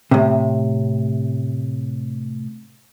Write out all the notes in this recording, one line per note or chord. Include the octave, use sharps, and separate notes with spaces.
A2 C3